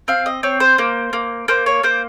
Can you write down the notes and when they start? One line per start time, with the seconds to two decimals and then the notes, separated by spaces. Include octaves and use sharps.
0.08 C4 F5
0.26 D#5
0.43 C4 C#5
0.60 C5
0.78 A#3
1.13 A#3
1.48 A#3 C5
1.66 C#5
1.83 A#3 C5